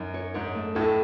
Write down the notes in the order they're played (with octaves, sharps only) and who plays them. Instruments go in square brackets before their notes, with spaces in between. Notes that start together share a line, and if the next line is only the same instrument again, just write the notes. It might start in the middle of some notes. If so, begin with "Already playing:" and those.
Already playing: [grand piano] F#2 [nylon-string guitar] D#4
[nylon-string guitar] C#5
[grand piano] G#2 [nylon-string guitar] C#5
[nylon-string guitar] A3
[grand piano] A2 [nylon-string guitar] A4